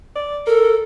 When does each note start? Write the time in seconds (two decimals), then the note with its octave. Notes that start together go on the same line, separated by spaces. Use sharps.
0.15 D5
0.47 A4 A#4